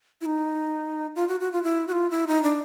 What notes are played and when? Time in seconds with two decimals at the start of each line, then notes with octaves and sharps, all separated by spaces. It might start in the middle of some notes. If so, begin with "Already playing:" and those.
0.21 E4
0.26 D#4
1.16 F4
1.28 F#4
1.40 F#4
1.52 F4
1.63 E4
1.88 F#4
1.92 F4
2.11 E4
2.28 D#4
2.43 D4